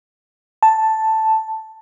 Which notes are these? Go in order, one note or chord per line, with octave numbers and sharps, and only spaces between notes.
A5